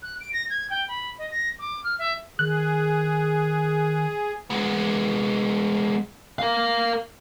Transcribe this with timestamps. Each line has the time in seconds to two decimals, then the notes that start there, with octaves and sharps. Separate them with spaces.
0.03 F#6
0.21 D7
0.33 A#6
0.50 G#6
0.70 G5
0.88 B5
1.19 D#5
1.31 A#6
1.59 D6
1.84 F6
1.99 E5
2.39 D#3 G#4 F#6
4.50 G#3 B3
6.39 A#4 F5